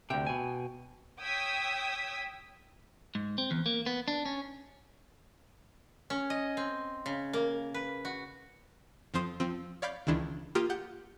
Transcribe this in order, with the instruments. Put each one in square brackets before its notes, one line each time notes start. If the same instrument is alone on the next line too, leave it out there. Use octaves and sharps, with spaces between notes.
[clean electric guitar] D2 C3 [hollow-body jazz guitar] G5
[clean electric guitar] B2 G#5
[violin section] C#5 G5 D#6 E6 G#6 B6
[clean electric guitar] G#2
C4
E2
A#3
B3
D4
C#4
[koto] C#4
D#5
C4
C#3
A#3
B4
F#4
[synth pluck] F2 F3 C4 C5 C6 D#6
F3 C4
C#5 D5 F5 B5 D6 G6
C#2 D#3 E3 G#3 D4 E4
A#3 F4 G4 A#4 D#6
G4 F#5 G6